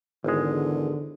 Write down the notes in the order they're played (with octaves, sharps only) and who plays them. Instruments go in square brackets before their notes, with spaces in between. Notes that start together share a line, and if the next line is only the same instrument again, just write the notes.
[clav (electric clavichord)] G#1 G#3 [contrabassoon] E2 [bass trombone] D3